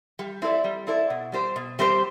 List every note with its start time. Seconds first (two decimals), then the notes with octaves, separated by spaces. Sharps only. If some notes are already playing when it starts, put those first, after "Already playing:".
0.19 G3
0.42 C4 E4 A4 D5
0.64 G3
0.87 C4 E4 A4 D5
1.10 B2
1.32 G3 C4 G4 C5
1.56 B2
1.79 G3 C4 G4 C5